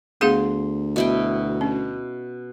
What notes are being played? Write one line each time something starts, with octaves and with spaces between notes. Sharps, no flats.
D2 B3 G#4 F5 C6
B2 E4 G5
C#4